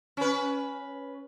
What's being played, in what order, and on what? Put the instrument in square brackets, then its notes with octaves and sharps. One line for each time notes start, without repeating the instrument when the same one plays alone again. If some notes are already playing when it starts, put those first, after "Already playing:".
[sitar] C#4 B4